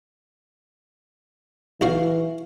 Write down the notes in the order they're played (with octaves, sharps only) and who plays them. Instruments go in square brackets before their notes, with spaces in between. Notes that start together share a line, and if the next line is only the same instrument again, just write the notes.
[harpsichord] B1 F#4 F5 [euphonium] E3